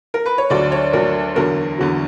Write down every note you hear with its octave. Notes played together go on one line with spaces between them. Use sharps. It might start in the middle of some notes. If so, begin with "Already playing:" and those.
A#4
B4
C#5
D2 D3 F#3 D5
C#5
D2 D3 F#3 A#4
E2 D3 F#3 A#4
E2 D3 F#3